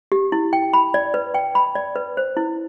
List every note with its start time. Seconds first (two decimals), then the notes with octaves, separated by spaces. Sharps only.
0.12 G4
0.32 E4
0.53 G5
0.73 B5
0.94 D5
1.14 B4
1.34 G5
1.55 B5
1.75 D5
1.96 B4
2.17 C5
2.37 E4